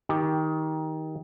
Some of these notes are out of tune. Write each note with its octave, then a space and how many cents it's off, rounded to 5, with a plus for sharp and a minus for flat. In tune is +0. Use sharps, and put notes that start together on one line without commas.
D#3 +15 G4 +0